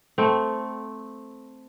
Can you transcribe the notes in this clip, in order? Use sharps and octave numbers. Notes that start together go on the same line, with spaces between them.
A3 C4